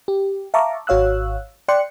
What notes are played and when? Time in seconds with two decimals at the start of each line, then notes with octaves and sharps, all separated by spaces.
0.08 G4
0.54 E5 F5 A5 A#5 C#6 D6
0.87 G#1 F#4 C#5 F5 E6 F#6
1.68 D5 G5 C6 F#6 C#7